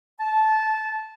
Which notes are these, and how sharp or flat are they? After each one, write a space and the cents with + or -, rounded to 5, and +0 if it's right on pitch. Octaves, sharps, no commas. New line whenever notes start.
A5 -15